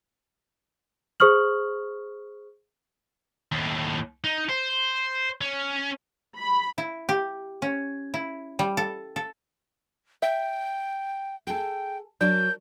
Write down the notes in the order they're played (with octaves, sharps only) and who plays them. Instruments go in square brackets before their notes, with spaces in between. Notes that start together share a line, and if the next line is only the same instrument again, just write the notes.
[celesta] G#4 C5 C#6 D#6 F6 F#7
[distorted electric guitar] D#2 A2
D#4
C5
C#4
[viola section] B5
[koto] E4
G4
C#4
E4
G3
A4
A4
[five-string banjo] E5 [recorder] G5
[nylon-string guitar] G#4 A4 [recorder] G5
[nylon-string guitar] F#3 [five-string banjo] D4 A#4 [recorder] G6